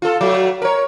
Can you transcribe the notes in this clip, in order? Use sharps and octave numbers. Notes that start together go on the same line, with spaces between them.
F4 A4
F#3 A3
A#4 C#5